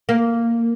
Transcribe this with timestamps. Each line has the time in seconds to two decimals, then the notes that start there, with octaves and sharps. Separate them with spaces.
0.09 A#3